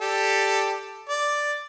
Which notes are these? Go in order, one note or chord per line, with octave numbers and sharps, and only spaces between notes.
G4 A4 D5
D5